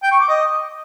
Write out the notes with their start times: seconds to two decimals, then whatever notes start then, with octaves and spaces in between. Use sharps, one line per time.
0.03 G5
0.11 C#6
0.20 D6
0.28 D#5